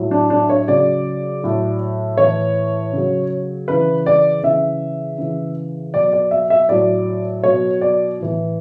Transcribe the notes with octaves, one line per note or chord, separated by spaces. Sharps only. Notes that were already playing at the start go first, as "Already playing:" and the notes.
Already playing: A2 F#3
D4
D4
C#5
C#3 F#3 D5
A2 F#3
A2 E3 C#5
C#3 F#3
C#3 E3 B4
D5
C#3 E3 E5
C#3 E3
B2 F#3 D5
D5
E5
E5
A2 F#3 D5
B2 F#3 C#5
D5
A2 E3